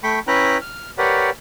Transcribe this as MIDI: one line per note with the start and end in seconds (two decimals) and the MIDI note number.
0.03 0.19 57
0.03 0.19 79
0.03 0.19 83
0.03 0.19 85
0.28 0.58 61
0.28 0.58 64
0.28 0.58 71
0.28 0.58 79
0.28 0.58 82
0.28 0.58 90
0.62 0.91 89
0.98 1.30 67
0.98 1.30 70
0.98 1.30 71
0.98 1.30 73
0.98 1.30 74
0.98 1.30 78